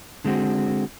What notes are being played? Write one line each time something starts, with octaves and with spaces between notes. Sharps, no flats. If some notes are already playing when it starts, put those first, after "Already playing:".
D3 G#3 C4 F#4